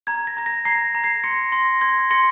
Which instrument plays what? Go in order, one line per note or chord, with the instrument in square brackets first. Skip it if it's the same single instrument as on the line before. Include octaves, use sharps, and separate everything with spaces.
[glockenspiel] A#5 G#6
A#6
A#5 G#6
A#6
A#5 G#6 C7
A#6
A#5
G#6 C7
C6 A#6 C#7
C6 A#6
C6 G#6
A#6
C6 A#6 C#7